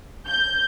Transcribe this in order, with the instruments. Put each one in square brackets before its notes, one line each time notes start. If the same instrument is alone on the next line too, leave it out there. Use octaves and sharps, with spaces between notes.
[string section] G6